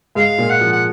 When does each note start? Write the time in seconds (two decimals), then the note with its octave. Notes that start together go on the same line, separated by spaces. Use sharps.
0.15 G#2 G#3 F5
0.38 A#2 A#3
0.50 F#5
0.61 F3
0.72 F#5